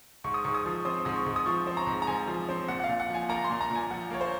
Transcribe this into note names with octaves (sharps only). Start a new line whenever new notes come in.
G#2 C#6
D#6
G#2 C#6
D#6
F3
C4 D#6
G#2 D#6
C#6
G#2
D#6
F3 C#6
C4
A#5
G#2
A#5
G#2 G#5
F3
C4
A#2 F#5
F#5
A#2 F5
F#5
F3 G#5
A#3 A#5
C6
A#2
A#5
A#2 G#5
F3 F#5
A#3 C#5
C5